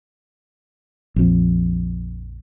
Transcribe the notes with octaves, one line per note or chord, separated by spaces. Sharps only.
A#1 F2